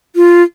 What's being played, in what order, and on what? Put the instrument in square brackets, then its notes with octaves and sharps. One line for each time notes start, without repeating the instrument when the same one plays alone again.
[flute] F4